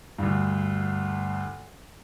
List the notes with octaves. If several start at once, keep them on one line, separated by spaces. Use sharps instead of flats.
D2 G2